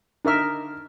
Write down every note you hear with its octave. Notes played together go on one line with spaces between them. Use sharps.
D3 D#4 A#4 E5 F6